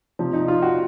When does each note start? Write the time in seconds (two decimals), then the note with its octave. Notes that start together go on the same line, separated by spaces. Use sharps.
0.19 C3 F3 C4
0.33 D#4
0.48 F4
0.62 F#4